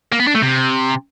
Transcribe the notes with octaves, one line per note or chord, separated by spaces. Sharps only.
A#3
B3
D4
A3
C3